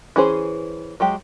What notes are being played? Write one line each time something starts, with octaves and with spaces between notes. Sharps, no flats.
E3 C#4 G#4 C5
F#3 G#3 G4